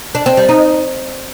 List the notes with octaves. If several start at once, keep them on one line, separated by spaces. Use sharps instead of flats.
D4
C4
G3
D#4